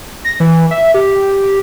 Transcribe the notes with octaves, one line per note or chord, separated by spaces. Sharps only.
A#6
E3
E5
G4